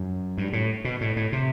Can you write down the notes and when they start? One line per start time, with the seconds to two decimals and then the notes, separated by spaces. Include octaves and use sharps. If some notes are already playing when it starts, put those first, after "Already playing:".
Already playing: F#2
0.38 G2
0.53 A2
0.85 B2
1.01 A2
1.16 A2
1.33 C3